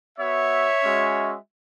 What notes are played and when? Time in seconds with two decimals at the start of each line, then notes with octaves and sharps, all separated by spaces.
0.18 B3 F#4 C#5 E5
0.84 G#3 C#4 F#4